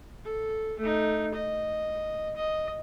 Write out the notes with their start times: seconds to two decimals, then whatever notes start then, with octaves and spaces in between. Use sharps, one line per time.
0.25 A4
0.79 A3 D#4
1.34 D#5
2.36 D#5